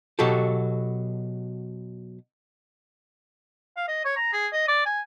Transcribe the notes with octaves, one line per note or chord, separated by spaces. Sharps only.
B2 F#3 F#4 G4 A4
F5
D#5
C#5
A#5
G#4
D#5
D5
G#5